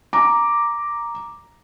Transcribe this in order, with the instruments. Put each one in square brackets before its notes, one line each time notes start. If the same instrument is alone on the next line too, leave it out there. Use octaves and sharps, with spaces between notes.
[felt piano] A#5 D6